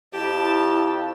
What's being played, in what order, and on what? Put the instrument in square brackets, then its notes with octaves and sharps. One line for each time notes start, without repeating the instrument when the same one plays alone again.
[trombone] F2 [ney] E4 [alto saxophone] G4 [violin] A5